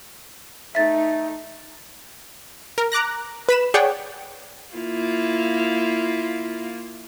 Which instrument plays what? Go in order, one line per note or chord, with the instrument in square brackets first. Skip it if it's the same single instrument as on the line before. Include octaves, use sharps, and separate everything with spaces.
[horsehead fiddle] A3 D#4 [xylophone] E5 A6
[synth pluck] A#4
A#5 D6 F#6 A#6
B4 B5 E7
G#4 C#5 D5 F#5 G5
[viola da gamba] A#3 E4 F4